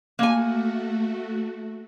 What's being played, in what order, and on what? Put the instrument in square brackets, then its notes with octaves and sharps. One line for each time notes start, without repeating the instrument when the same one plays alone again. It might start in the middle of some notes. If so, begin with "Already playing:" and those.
[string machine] A3 F#4 [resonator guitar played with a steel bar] A#3 G#5